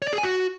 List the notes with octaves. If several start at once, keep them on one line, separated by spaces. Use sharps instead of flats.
C#5
D5
G#4
G#5
F#4